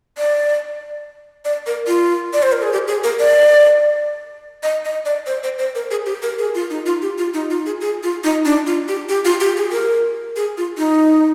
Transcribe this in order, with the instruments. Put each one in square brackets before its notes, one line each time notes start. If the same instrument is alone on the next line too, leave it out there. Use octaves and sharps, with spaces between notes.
[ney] D5
D5
A#4
F4
D5
C5
A#4
G#4
G4
G#4
A#4
D5
D#5
D#5
D5
C5
C5
C5
A#4
G#4
G4
A#4
G#4
F4
D#4
F4
G4
F4
D#4
F4
G#4
G#4
F4
D#4
D4
F4
G4
G4
F4
G4
G#4
A#4
G#4
F4
D#4